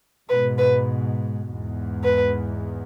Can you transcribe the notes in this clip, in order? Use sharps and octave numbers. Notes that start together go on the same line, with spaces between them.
G#2 B2 B4
B4
E2 G#2
B4